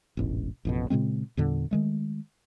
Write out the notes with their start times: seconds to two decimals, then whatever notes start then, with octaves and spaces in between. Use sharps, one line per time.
0.17 E1 A1 G#2
0.65 A1 F2 B2
0.90 A#2 C#3 G#3 C4
1.37 E2 A#2 D3 G3
1.71 D#3 G#3 A3